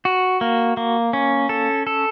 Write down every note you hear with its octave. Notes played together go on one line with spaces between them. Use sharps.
F#4
A#3
A#3
C#4
A4
A4